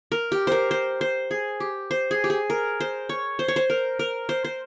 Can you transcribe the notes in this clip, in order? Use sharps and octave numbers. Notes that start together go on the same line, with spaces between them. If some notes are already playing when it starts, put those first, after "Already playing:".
A#4
G4
A#4 C5
C5
C5
G#4
G4
C5
G#4
G4
G#4
A#4
C5
C#5
C5
C#5
C5
A#4
A#4
C5
C5